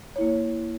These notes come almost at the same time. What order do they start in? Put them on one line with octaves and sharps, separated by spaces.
C#5 E4 A#3